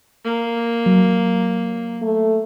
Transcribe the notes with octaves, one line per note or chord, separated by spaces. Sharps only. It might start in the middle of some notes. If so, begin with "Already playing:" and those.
A#3
F#3
A3